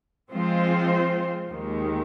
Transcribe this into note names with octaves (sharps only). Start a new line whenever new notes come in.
F3 G#3 C4 F4 C5
D#2 D#3 G#3